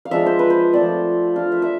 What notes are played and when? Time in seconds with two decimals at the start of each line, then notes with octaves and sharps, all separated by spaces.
0.05 F5
0.11 F3 G#3 D4 E5
0.26 C5
0.39 B4
0.50 C5
0.73 F3 A3 C4 D5
1.35 A3 D4 F4 F5
1.52 E5
1.62 E5